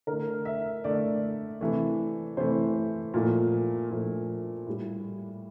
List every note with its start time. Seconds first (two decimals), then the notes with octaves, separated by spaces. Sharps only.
0.07 D3 A3 A#4
0.45 E5
0.84 D3 A3 D5
1.61 C3 E3 A3
2.37 C3 E3 A3 C5
3.14 A#2 F3 A3
3.90 A#2 F3 A3
4.66 A2 G3